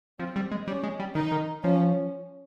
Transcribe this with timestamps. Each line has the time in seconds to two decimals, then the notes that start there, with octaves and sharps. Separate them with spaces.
0.19 F3 C4
0.36 G3
0.52 G#3
0.67 G3 C#4
0.83 G#3
1.00 G3
1.15 D#3 D#4
1.32 D#3
1.63 F3 C#4